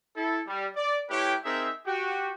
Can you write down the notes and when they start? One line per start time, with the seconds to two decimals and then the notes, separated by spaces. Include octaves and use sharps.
0.16 E4 A4
0.47 G3
0.76 D5
1.10 A3 E4 G4 B4 C#5 G5
1.44 C4 D#4 G#4 A#4 E5
1.86 F#4 G4 G5